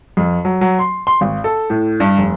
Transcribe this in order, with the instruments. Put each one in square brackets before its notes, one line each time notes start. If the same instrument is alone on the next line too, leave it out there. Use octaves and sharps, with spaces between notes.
[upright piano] F2
F#3
F#3
C6
C6
G#1
A4
A2
G2
F1